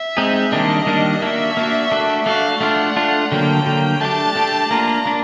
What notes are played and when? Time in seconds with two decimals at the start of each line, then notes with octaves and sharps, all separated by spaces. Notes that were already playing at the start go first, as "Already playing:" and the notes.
Already playing: E5
0.17 G#3 C4 D#4 G#4
0.52 D#3 G3 A#3 D4 D#5
0.86 D#3 G3 A#3 D4
1.22 A#3 D4 F#4 E5
1.57 A#3 D4 F#4
1.92 A3 D4 F#4
2.26 A3 D4 F#4 F5
2.61 A3 D4 F4 F#5
2.96 A3 D4 F4
3.32 D3 F#3 A#3 G5
3.66 D3 F#3 A#3
4.01 A3 D4 G4 A5
4.35 A3 D4 G4
4.71 A#3 D4 F4 A#5
5.06 A#3 D4